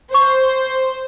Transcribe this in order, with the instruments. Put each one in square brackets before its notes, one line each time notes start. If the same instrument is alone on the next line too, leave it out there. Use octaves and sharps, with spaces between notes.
[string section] C5 [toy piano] C#6